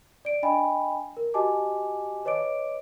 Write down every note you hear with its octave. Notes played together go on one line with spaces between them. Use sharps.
D5 D7
D4 D#5 G5 G#5 B5
A#4
F#4 G4 D#5 G#5 A5 D6
B4 C#5 D#5 D6 D7